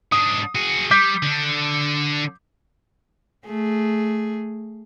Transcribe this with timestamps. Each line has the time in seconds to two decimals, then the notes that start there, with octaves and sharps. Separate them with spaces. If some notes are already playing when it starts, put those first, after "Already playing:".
0.12 G#2 D4 D#6
0.55 F#4 G#4
0.91 G3 D6 G6 B6
1.23 D3 D4
3.46 A3 G#4